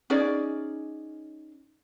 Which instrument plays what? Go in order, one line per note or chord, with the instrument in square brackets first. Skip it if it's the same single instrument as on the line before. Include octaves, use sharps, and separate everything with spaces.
[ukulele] C#4 D#4 G#4 D5